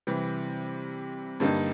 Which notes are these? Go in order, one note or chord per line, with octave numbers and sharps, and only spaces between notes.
C3 E3 G3
G2 D3 G3 A#3 D#4